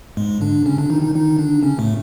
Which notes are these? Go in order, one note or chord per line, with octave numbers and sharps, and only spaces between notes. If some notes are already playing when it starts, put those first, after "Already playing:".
G#2 G#3
D3 D4
C#3 C#4
D3 D4
D#3 D#4
D#3 D#4
D#3 D#4
D3 D4
C#3 C#4
A2 A3